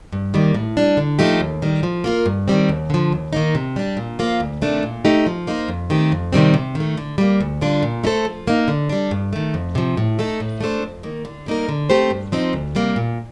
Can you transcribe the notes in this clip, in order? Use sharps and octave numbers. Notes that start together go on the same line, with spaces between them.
G2
D#3 G3 A#3
A2
G3 D4
D3
F3 A3 D#4 G4
D#2
D#3 G3
F3
A#3 F4 A#4
G2
D#3 G3 C4
D#2
D3 F3
D#2
D#3 A#3 D#4
C3
G3 D4
A#2
F3 A#3 F4
D2
C3 D#3 A3 D4
A#2
A3 D#4 G4
F3
A#3 D#4 A4 C5
F2
D#3 A3 C4 G4
F2
C3 D#3 G3 C4
C3
D#3
A3
D3
G3 A#3
D2
D3 G3 D4 F4
A#2
A3 D#4 A4 C5
F3
A#3 D#4
D3
G3 D4
G2
D#3 A3
F2
C3 F3
A2
A3 D#4 A4
A2
A3 D4 A4 C5
F2
D#3 A#3
D3
G3 A#3 D#4 A#4
D3
A3 C4 G4 C5
G2
F3 C4 D#4
D2
C3 G3 A#3
A#2